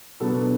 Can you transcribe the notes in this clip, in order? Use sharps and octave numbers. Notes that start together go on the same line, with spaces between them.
B2 F#3 B3 D4 A4